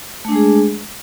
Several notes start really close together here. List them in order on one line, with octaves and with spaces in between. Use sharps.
A3 D4 G#3 G#4